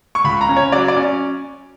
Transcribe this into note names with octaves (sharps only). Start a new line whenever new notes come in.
C#6
C#2 B5
A#5
C#4
C#5
F#3 D5
D5
C#4